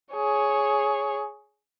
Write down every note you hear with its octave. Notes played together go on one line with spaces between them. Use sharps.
G#4 C#5